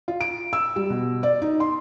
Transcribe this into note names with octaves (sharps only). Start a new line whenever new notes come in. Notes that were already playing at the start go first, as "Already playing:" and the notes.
F4
D7
E6
G3
B2
D5
D#4
C6